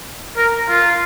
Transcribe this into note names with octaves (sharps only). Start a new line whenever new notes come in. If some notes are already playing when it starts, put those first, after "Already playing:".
A#4
F4